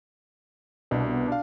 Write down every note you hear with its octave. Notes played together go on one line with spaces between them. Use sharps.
C2 B2 D4
D4 F5